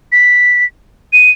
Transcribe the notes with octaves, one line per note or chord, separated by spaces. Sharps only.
B6
D#7